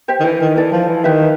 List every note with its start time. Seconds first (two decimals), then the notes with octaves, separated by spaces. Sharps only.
0.08 G4 C5 E5 G5
0.20 D#3
0.25 E3
0.41 D#3
0.56 E3 E4 A4 D5
0.72 F3
0.88 E3
1.04 D#3 E4 G4 B4 E5